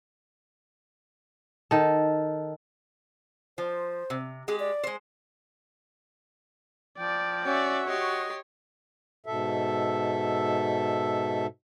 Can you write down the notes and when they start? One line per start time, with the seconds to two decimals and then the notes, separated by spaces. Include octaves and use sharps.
1.71 D#3 A4
3.58 F3 C5
4.10 C3
4.48 G#3 G4 G#4
4.60 D5
4.84 G#3 C5
6.99 F3 D5 G5
7.45 C#4 F#4 D5 E5
7.88 G4 C#5 D#5 C6
9.26 G#2 B2 A4 E5